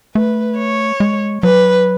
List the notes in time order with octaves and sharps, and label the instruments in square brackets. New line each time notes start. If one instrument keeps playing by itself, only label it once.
[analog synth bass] A3 [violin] B4
[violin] C#5
[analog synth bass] G#3
[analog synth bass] F#3 [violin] B4